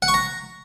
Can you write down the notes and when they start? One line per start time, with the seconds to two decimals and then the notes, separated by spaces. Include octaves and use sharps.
0.02 F#5
0.08 C#6
0.14 A#5